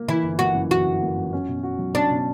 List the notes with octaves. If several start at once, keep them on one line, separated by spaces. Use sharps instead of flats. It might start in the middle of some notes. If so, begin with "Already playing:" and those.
Already playing: A#3
E3 E4
G1
A#3 F#4
F#2
E3 F#4
G1
A#3
F#2
C#4
B2
F#4
F#3
C#4 D4
B2